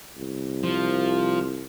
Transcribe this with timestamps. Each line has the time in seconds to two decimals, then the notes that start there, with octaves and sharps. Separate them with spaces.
0.17 C2
0.64 F3